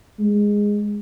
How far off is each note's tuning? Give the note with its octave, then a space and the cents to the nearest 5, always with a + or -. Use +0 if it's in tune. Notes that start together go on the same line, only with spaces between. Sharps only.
G#3 -10